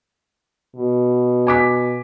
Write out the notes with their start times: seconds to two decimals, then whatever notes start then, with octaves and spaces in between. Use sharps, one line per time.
0.76 B2
1.47 G#5 D6 B6